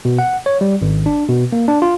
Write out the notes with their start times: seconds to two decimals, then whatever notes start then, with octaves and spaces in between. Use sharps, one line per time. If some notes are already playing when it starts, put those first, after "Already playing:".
0.05 B2
0.19 F#5
0.46 C#5
0.61 G3
0.81 G#1
1.06 D4
1.29 B2
1.52 A#3
1.68 D4
1.82 F4